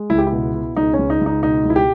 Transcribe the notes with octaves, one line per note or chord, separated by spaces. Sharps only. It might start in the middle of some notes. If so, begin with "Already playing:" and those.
Already playing: G#3
C#2 E4
G4
E4
B2
B2
C#2 D#4
C#4
C#2
D#4
C#2
D#4
B2 D#4
C#2
E4
G4